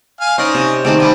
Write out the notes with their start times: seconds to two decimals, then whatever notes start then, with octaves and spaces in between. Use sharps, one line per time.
0.21 F5 G#5
0.38 C#4 D#4 C5 D5 D#5
0.55 C3
0.85 D#3 G#3 A3 C4 D5
1.00 G3 C4 E4 G#5